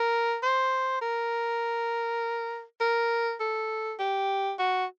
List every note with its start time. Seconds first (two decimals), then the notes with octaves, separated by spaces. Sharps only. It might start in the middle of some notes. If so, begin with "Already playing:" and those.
Already playing: A#4
0.43 C5
1.02 A#4
2.81 A#4
3.40 A4
3.99 G4
4.59 F#4